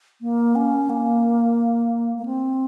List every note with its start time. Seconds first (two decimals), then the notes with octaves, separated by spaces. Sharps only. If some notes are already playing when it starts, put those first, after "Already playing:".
0.21 A#3
0.55 C#4
0.89 A#3
2.18 A#3
2.25 C4